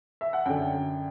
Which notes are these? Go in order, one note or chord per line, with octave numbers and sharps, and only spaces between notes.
E5
F#5
F#2 D3 G5